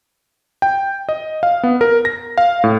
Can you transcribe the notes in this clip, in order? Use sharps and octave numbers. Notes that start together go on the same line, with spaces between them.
G5
D#5
F5
B3
A#4
A#6
F5
A2